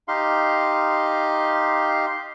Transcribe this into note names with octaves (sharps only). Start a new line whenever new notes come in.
D#4 G4 F5 C6